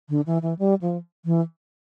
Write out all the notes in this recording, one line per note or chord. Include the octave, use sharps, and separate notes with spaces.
D3
E3
E3
G3
F3
E3